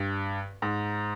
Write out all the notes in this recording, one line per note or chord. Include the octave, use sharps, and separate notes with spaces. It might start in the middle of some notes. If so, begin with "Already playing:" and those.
Already playing: G2
G#2